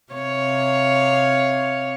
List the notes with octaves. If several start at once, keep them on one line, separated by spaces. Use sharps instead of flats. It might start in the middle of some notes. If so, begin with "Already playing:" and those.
C3 C#5 F5